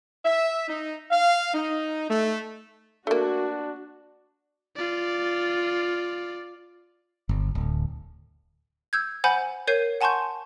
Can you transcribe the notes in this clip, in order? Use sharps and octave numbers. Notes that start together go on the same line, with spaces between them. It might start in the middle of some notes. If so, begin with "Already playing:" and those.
E5
D#4
F5
D#4
A3
A3 A#3 D4 F#4
F4 D5
G1
D1
E6 G6 G#6
C5 F#5 G#5 B5 G6
A#4 C#5 G6 C7 D#7
F#5 G#5 A5 C6 C#6 G6